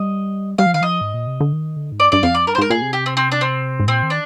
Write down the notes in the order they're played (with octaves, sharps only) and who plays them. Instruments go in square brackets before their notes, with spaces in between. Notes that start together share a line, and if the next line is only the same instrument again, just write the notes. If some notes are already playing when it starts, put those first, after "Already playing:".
Already playing: [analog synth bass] G3 [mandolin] D#5
[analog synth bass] G3 [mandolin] F5
[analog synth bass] F3
[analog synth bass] D#3 [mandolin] F5
[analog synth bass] F3 [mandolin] D#5
[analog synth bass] G#2
A#2
C3
D3
D#3
D3
G#2
[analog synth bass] G2 [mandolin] D5
[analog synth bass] G2 [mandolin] D5
[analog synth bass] F2 [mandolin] F5
[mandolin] D5
[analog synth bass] G2 [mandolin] A#4
[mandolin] C5
[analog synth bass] G#2 [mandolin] A#4
[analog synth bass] A#2 [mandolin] G#4
[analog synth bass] C3
[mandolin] G4
C4
C4
D4
C4
[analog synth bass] G#2
[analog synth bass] A#2 [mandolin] C4
[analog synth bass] D#3
[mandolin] D4